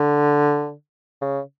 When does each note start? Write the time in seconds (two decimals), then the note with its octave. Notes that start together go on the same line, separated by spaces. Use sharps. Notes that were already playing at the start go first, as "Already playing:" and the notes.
Already playing: D3
1.21 C#3